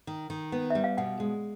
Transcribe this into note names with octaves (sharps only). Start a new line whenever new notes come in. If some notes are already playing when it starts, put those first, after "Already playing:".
D#3
D#3
B3
G3 E5
F5
B2 F#5
G#3